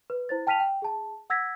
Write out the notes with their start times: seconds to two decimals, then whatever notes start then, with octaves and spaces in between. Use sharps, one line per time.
0.10 B4
0.29 E4 C5 A6
0.47 G5 A5 F6 B6 D#7 F7
0.60 G5
0.82 G#4 A5
1.30 F#5 E6 G#6 A#6 B6